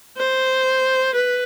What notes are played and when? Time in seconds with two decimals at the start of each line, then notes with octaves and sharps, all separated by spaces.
0.17 C5
1.15 B4